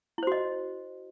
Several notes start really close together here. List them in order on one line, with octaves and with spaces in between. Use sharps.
E4 C5 F#4 D#5